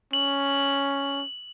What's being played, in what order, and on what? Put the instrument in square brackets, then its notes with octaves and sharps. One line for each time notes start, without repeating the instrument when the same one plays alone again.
[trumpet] C#4 [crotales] F#7